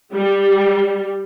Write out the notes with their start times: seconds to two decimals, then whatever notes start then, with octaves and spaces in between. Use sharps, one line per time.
0.12 G3